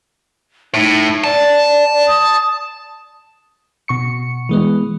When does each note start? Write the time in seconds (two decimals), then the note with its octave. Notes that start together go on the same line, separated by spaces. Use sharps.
0.74 A2 D#4
1.24 D5 A5
2.07 D#6
3.88 B2 C#6 C#7
4.49 E3 G#3 B3